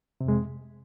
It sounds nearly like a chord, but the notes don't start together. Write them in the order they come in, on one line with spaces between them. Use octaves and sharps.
C3 F2 G#3